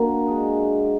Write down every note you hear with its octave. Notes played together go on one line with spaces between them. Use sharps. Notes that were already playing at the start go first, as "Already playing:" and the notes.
Already playing: A#3 D4 F#4
G#3 D4 G#4